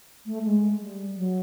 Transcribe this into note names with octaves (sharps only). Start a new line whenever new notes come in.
A3
G#3
G3
F#3